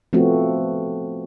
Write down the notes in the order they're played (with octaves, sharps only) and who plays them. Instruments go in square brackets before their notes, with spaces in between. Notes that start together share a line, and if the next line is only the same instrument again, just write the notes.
[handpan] F3 A3 B3 C4 F#4